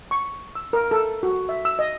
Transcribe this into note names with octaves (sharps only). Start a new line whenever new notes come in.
C#6
E6
A#4
A4
F#4
E5
E6
D#5